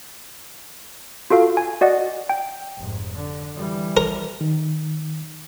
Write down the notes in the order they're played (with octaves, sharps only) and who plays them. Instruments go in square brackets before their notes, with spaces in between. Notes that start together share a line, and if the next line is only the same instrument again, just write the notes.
[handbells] F4 F#4 A4 F5
G#5
F#4 D5 D#5 F#5
G5
[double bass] F1 G#2
D3
E3 G3
[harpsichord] A#4
[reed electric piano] D#3